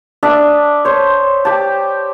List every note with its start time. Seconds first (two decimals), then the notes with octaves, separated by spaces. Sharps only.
0.23 D4 E5 A5 D#6
0.85 C5 C#5
1.45 G4 A5